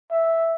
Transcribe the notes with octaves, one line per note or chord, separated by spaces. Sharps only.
E5